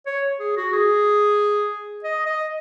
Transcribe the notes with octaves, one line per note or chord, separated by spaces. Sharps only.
C#5
G#4
F#4
G#4
D#5
D#5